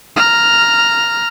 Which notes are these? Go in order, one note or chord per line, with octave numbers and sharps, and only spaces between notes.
A#5 F6